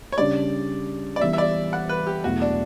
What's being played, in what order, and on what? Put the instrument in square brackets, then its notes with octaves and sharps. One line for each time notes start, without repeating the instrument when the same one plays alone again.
[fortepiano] C#5
[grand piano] C#3 G3 D4 [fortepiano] D5
[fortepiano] D5
[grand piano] E3 G3 B3 [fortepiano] E5
[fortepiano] E5
D5
F#5
B4
G4
[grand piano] E2 B2 F#3 A3 E4 [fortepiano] F#4
[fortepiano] D4